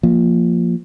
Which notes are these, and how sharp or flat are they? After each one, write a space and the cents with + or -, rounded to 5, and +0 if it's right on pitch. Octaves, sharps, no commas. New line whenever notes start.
F3 +0 A#3 +0